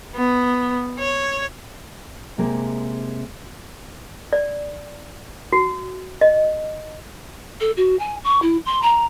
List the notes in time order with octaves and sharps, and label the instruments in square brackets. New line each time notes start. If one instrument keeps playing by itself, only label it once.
[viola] B3
C#5
[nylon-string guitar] C3 G#3 A#3
[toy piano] D5
F#4
D#5
[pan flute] A4
F#4
G#5
C#6
E4
C6
A#5